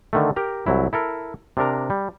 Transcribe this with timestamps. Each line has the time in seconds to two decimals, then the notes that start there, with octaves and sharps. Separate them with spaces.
0.13 D3 D#3 A3
0.36 G4 A#4 A#5
0.66 C2 F#3 E4
0.93 E4 A4 A#4
1.57 C3 D4 A#4 A#5
1.90 G3